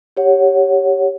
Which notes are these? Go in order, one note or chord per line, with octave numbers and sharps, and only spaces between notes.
G4 C#5 F#5